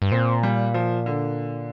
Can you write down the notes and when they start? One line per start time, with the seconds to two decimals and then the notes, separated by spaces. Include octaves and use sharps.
0.02 G2
0.12 A#2 C4
0.43 G3
0.74 F3
1.06 D3